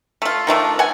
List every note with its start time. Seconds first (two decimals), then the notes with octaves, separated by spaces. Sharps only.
0.22 A3 F4
0.47 D#3 F3 A3 D4
0.79 F#5 G#5